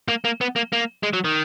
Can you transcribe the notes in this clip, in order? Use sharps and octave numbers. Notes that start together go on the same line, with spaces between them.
A#3
A#3
B3
A#3
A#3
G#3
F#3
D#3